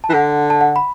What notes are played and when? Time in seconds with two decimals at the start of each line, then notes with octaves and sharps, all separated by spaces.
0.04 A5
0.09 E3
0.14 D3 F#5
0.50 A5
0.61 F#5
0.76 B5